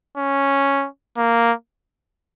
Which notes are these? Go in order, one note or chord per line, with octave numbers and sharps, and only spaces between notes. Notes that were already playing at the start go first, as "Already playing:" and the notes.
C#4
A#3